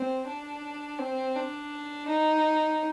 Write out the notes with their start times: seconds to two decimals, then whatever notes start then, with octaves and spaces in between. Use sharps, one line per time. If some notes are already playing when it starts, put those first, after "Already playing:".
Already playing: C4
0.27 D4
0.99 C4
1.35 D4
2.08 D#4